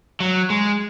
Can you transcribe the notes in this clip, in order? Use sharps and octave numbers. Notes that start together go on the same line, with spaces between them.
F#3
G#3